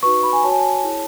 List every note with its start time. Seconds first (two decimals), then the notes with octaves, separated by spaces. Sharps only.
0.03 D#4 F#4 B4 C#6
0.23 B5
0.33 G#5
0.43 F#4 C#5 A5
0.51 G#5
0.60 A5
0.83 E4 G#4 C#5